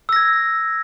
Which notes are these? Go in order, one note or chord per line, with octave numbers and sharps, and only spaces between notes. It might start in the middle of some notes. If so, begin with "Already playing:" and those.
E6 G#6 A#6